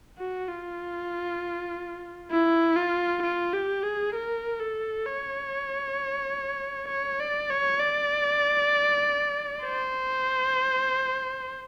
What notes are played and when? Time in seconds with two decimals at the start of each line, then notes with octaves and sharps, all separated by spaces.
0.18 F#4
0.48 F4
2.32 E4
2.77 F4
3.23 F4
3.53 G4
3.83 G#4
4.15 A#4
4.60 A4
5.05 C#5
6.88 C#5
7.20 D5
7.50 C#5
7.80 D5
9.63 C5